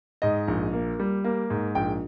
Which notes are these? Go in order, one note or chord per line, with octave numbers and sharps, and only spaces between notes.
G#2 D#5
A#1
A#3
G3
A#3
G#2
A#1 G5